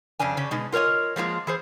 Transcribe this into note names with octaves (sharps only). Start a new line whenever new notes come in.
F2 C#3 C#4 D4 G#5
C#3 C#4 D4
B2 G#3 D#4
F4 A#4 C5 C#5 D#5
F3 G#3 A#3 F4
E3 G#4 C5